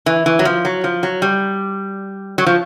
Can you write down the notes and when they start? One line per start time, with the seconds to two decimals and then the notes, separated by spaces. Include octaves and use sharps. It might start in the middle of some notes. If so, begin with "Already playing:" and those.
0.06 E3
0.26 E3
0.39 F#3
0.45 F3
0.65 F#3
0.84 F3
1.03 F#3
1.22 G3
2.38 F#3
2.46 F3